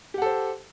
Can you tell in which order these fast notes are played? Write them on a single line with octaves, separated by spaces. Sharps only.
G4 F#5 A4 C5